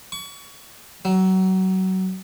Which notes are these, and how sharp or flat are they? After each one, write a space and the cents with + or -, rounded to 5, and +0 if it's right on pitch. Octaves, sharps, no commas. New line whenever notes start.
C#6 +30
F#3 +25